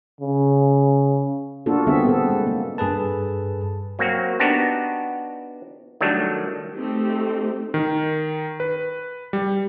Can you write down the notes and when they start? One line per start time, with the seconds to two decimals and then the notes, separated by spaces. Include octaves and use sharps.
0.21 C#3
1.66 A#3 D4 F4 F#4 A4
1.87 D3 G3 B3 C4 G#4 E5
2.05 B3 C4 A4
2.30 G#3
2.47 A#3
2.78 G2 G#4 A4 B4 A5
3.99 F#3 A#3 C4 F#4
4.40 B3 D4 D#4 F#4 G4
6.01 D#3 F#3 G3 A3 D4
6.74 A3 C4 D#4 G4
7.74 D#3
8.60 B4
9.33 G3